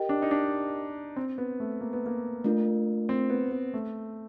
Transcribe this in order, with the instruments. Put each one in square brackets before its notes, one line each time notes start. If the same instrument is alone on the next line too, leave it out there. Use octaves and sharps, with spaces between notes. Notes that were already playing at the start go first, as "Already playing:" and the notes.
Already playing: [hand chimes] G4 A#4 D#5 G5
[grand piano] D4
D#4
D4
C4
B3
A3
A#3
B3
A#3
[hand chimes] A3 D4 F4 A#4
[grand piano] C4
B3
B3
A3